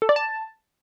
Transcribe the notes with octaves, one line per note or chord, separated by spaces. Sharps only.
A4
D5
A5